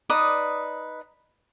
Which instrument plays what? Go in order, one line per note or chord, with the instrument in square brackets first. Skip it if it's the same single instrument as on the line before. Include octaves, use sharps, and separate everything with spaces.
[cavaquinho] D#4 B4 D5 D#6